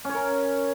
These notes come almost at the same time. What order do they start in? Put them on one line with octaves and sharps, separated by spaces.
C#4 C#5 A#4